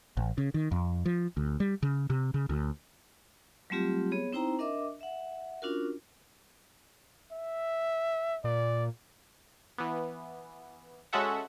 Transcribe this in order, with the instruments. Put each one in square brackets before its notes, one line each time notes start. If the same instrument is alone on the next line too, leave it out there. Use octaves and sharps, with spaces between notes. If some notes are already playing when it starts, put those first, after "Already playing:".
[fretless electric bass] A1
C#3
D#3
F2
F3
D2
G3
C#3
C3
C#3
D2
[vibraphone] F#3 G3 A3 C4 F4 G4
B3 G#4 C#5
C4 D#4 E4 C5 G5 A#5
D4 A#4 D#5 E5 D6
E5 F#5
C#4 D4 F4 F#4 A#4
[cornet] E5
[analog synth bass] A#2 [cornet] D5
[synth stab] E3 B3
G#3 C#4 F#4 A4 E5 F#5